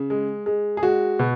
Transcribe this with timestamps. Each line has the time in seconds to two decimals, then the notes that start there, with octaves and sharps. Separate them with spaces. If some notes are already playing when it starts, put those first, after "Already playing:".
Already playing: C#3
0.10 G#3
0.46 G#3
0.77 G#4
0.83 G#3 F#4
1.19 B2